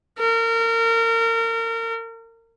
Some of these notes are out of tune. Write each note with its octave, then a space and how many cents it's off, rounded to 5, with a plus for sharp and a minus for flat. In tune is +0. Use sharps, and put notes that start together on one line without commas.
A#4 -30